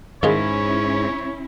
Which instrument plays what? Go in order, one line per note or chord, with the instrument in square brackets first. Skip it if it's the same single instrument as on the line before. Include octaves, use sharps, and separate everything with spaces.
[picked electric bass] G#2 [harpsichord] D#3 F4 G#4 [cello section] C#4 E4 [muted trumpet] C#5